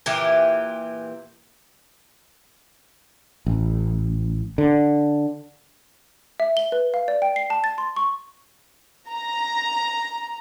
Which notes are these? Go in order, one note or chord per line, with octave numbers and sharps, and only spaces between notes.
A#2 E3 G4
A1
D3
E5
G7
B4
F5
D5
G5
C7
A5
A6
C6
C#6
A#5